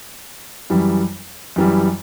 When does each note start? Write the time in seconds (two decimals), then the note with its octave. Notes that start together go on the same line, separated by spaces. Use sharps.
0.70 F#2 E3 G3
1.56 F#2 E3 G3